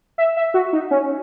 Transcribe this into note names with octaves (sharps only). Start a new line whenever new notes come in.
E5
E5
F#4
D#4
C#4